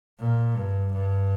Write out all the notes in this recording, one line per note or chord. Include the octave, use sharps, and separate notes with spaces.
A#2
G2
G2